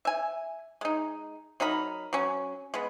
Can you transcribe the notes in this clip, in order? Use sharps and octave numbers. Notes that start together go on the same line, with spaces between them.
E5 G#5
G#3 D#4
F#3 D#4 A#4 B5
F#3 C#4
G#3 B3